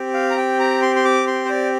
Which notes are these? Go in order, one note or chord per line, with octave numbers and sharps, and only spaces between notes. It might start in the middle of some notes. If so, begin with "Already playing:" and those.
Already playing: C4 G4
F5
A#5
G5
A#5
C6
C6
D6
C6
C5
D5